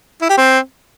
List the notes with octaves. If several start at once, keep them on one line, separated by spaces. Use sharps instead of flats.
E4
G4
C4